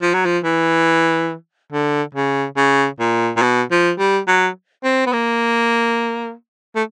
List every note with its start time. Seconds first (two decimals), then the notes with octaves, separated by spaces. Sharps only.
0.02 F3
0.14 F#3
0.25 F3
0.44 E3
1.73 D3
2.15 C#3
2.57 C#3
3.00 A#2
3.37 A#2
3.42 B2
3.71 F3
3.99 G3
4.27 F#3
4.84 C4
5.06 B3
5.13 A#3
6.76 A3